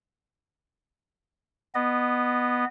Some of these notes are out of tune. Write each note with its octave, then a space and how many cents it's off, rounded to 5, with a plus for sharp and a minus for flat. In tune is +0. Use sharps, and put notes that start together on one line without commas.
B3 +0 D#5 -30